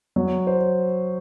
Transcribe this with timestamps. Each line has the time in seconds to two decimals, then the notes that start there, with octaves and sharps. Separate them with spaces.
0.16 F#3
0.47 C5